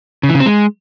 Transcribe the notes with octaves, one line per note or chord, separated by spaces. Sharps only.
C#3
E3
C#3
C4
G#3